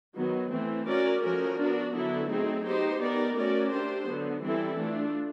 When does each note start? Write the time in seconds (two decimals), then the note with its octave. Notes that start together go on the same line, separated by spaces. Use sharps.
0.15 D#3 F#3 B3
0.51 E3 A3 C4
0.86 C#4 F#4 A#4 D5
1.22 F3 A3 C#4 F#4 A#4
1.58 B3 D4 F#4 A#4
1.93 D3 F#3 B3 E4 A4
2.29 F#3 A3 C4 D#4 G#4
2.65 B3 D#4 G4 C5
2.99 B3 D#4 G4 A#4 D5
3.35 A3 C#4 F#4 A#4 D5
3.71 A3 D4 G4 C5
4.06 D3 F#3 B3
4.43 E3 G3 C4 E4 A4
4.77 A3 D4 F4